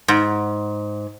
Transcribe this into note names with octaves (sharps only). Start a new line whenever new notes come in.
G#2